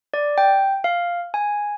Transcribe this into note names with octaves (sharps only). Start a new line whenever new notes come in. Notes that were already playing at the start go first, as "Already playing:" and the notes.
D5
G5
F5
G#5